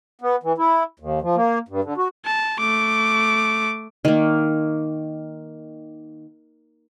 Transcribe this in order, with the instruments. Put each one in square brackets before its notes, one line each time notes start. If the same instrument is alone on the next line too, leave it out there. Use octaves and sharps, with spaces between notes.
[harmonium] B3
E3
E4
D#2
F3
A#3
G2
D3
F#4
[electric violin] A5
A3 D6
[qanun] D#3 A#3